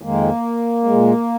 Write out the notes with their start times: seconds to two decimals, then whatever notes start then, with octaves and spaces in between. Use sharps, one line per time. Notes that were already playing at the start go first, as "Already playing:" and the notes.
0.01 F2 D#3 G#3 A#3
0.84 A#2 G#3